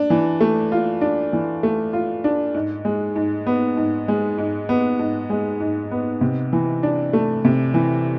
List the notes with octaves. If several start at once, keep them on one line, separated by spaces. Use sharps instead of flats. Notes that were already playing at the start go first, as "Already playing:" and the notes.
Already playing: D4
E3
A3
F4
D4
E3
A3
F4
D4
G#2
G#3
G#2
B3
G#2
G#3
G#2
B3
G#2
G#3
G#2
B3
C3
E3
D4
A3
C3
E3